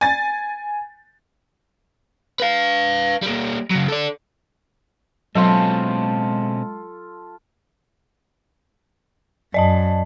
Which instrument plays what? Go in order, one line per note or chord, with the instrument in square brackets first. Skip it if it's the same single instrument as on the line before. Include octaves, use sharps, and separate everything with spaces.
[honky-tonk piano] G#5 A6
[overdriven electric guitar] B4 F5
G3 A#3
C#3 F#3
A4 D5
[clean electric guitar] B2 C4 C#4 [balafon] F#3 [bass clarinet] G#3 [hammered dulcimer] F4 A4
[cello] F#2 [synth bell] D5 D#5 A5